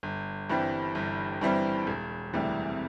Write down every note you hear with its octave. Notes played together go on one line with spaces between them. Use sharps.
G1
G2 E3 G3 C4
G1
G2 E3 G3 C4
E1
D2 C3 E3 G3